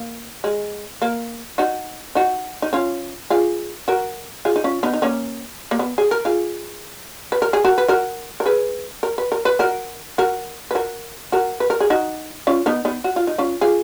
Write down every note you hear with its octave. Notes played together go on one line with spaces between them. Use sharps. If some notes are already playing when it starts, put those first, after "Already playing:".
Already playing: A#3
G#3
A#3
D#4 F#4
D#4 F#4
D#4
C#4 F4
F4 G#4
F#4 A#4
F4 G#4
D#4
C#4 F4
B3 D#4
D#4
A#3 C#4
A#3
B3
G#4
A#4
F4 G#4
B4
A#4
G#4
F#4 A#4
B4
F#4 A#4
A#4
G#4 B4
A#4
B4
A#4
B4
F#4 A#4
F#4 A#4
B4
F#4 A#4
F#4 A#4
B4
A#4
G#4
D#4 F#4
C#4 F4
B3 D#4
B3 D#4
F#4
F4
D#4
C#4 F4
F4 G#4